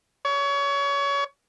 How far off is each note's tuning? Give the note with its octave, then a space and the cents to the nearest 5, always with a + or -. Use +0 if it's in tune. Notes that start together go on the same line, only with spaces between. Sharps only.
C#5 +25